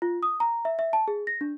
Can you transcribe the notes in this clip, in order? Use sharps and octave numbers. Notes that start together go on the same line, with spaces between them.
F4
D#6
A#5
E5
E5
A5
G#4
A#6
D4